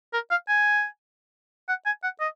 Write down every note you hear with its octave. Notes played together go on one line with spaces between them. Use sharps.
A#4
F5
G#5
F#5
G#5
F#5
D#5